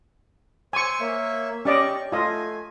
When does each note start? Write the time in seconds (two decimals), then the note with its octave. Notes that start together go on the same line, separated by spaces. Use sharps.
0.73 C5 G#5 C#6 E6
1.00 A#3 C#5 E5
1.65 C#4 G4 D5 D#5 C#6
2.12 A3 F4 D#5 G#5